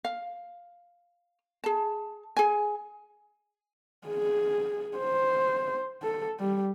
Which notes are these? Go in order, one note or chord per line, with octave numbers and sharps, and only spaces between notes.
F5
G#4 A5
G#4 G#5
G#4
C5
A4
G3